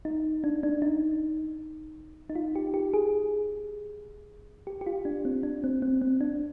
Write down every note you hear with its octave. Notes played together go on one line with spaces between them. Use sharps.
D#4
D4
D4
D#4
D#4
F4
G4
G4
G#4
G4
G4
F4
D4
C4
D4
C4
C4
C4
D4